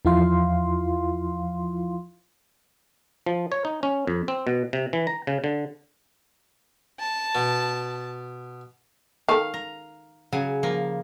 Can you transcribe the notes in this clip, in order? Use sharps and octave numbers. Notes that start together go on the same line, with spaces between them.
E2 F3 E4 F4 F5 C6
F3
C#5
D#4
C#4
F2
C4
B2
C3
E3
A#5
C#3
D3
A5
B2
D#3 A4 F5
A#5
C#3 F#3 G#5
F3 A#3